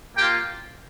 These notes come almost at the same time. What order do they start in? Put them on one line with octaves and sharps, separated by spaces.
A#3 G4 G5 F4